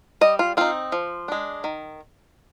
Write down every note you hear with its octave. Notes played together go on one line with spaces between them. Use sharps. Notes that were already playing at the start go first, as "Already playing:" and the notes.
G3 D#5
F4
C4 D#4 F4
F3
G#3 D4
D#3